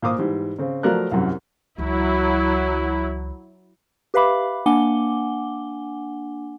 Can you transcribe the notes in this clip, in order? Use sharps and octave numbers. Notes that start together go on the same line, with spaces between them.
A#2 C5 F5 D6 D#6
G#2 E3 G3
C#3 C4
F3 F#3 A3 A#4 D5 F#6
C2 F#2
C#2 E3 F#3 E4
G4 B4 E5 F5 B5 D6
A#3 D4 F#5 G#5 D6 G7